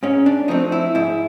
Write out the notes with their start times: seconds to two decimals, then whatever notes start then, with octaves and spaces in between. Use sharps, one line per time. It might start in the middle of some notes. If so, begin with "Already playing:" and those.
0.03 G#2 C#4
0.26 D4
0.48 F3 A3 C4 D#4
0.72 E4
0.95 G#2 E4